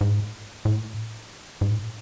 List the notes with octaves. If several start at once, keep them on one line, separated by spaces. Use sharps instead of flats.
G#2
A2
G#2
A2